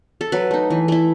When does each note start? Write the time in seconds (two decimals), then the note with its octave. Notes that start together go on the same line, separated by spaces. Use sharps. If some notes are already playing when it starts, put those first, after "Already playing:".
0.21 A4
0.32 F#3 B4
0.51 A3 D#4
0.70 E3
0.88 A3 E4